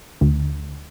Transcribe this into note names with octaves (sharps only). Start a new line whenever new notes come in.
D2